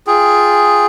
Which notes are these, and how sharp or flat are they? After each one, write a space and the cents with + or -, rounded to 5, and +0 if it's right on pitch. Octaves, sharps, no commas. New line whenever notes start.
F4 +0 G#4 +0 G5 +0